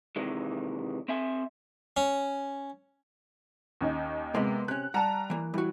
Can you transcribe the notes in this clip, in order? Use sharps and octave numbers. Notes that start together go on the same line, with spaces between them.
C3 D#3 E3 G#3
C4 E5 G#5
C#4
D#2 C#4 D#4
C3 G#3 A#3 B3
C3 C#4 F#6
G3 F#5 A5 A#5
E3 A#3
E3 G3 F#4